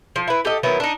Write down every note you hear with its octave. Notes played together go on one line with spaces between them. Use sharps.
F3
E4 B4
G4 A4 D#5
D#3 F#3 B3 E4
D4 D#4